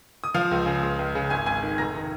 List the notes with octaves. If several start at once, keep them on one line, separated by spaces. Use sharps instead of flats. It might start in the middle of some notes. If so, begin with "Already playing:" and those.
D#6
F3 F5 F6
C#2
C#3
C#2
C#2
C#3
G#1 G#5 G#6
G#1 G#5 G#6
D#3
F1 A#5 A#6
D#3